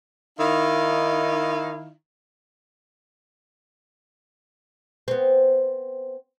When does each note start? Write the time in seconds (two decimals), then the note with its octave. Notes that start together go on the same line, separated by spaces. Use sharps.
0.39 D#3 D#4 E4 F5
5.08 B3 C4